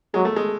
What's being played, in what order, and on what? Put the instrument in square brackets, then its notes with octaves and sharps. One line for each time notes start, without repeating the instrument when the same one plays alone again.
[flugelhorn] F#3 [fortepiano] G#3
[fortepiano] A3
G#3